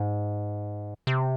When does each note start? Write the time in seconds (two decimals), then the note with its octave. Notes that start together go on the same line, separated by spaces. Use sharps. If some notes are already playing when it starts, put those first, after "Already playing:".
Already playing: G#2
1.07 C3